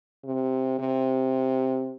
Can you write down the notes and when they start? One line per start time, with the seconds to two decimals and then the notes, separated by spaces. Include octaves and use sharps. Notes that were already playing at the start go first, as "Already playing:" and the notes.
0.24 C3
0.79 C3